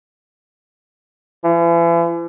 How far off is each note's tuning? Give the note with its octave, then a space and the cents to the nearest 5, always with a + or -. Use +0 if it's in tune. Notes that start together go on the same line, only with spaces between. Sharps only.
E3 +40